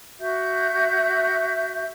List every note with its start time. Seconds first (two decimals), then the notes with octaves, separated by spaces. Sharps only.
0.20 F#4 E5 G6